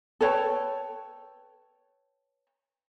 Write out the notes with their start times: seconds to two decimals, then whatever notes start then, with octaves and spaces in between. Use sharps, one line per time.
0.21 A4 B4 C#5 G5